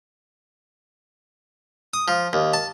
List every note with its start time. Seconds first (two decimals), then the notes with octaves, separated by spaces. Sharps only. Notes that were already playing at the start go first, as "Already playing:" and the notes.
1.94 D#6
2.08 F3
2.33 D#2
2.54 A5